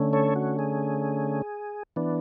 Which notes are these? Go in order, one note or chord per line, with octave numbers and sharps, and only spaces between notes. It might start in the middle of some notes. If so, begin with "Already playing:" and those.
Already playing: D3 A3 C#4
A4 C#5
F#4
G#4
E3 B3 D4